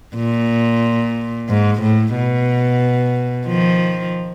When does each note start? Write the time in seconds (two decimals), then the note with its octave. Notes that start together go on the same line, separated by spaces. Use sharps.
0.16 A#2
1.49 G#2
1.82 A2
2.15 B2
3.47 D#3 F3